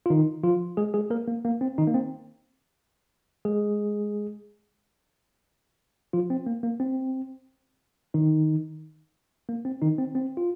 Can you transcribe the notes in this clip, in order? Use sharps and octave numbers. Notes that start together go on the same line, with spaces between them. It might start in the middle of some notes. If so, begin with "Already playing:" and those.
F4
D#3 D#4
F3 F4
G#3 G#4
G#3 G#4
A#3 A#4
A#3
A#3
C4
D#3 D#4
A#3
C4
G#3 G#4
F3 F4
C4
A#3
A#3
C4
D#3 D#4
A#3
C4
D#3 D#4
C4
C4
F4